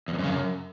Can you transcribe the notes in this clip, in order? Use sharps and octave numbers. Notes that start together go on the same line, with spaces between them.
E2
F2
F#2
C#3
F#2